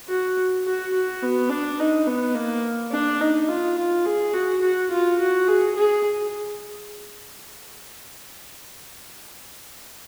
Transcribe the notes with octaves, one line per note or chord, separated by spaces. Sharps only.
F#4
F#4
F#4
B3
D4
D#4
B3
A#3
D4
D#4
F4
F4
G#4
F#4
F#4
F4
F#4
G#4
G#4